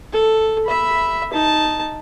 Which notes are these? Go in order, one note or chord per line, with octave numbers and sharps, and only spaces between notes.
A4
E5 B5
D#4 A5